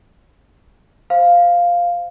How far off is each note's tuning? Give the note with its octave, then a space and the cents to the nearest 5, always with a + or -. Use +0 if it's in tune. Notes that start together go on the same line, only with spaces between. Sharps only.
C5 +0 F5 +0